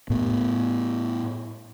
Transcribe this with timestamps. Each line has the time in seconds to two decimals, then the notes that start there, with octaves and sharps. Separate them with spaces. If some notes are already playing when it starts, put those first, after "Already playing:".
0.10 A2 B3